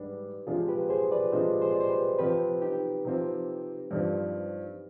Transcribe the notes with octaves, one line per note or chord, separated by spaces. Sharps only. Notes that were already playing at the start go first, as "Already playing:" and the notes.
Already playing: G#2 G3 D4 G4 B4
C3 F3 G#3 D4 F4 G#4
G4 B4
G#4 C5
B4 D5
C3 F3 G#3 D4 C5 D#5
G#4 C5
D5
C5
G4 B4
C3 F3 C4 G4 B4
D#4 G4
C3 F3 C4
G2 F3 C4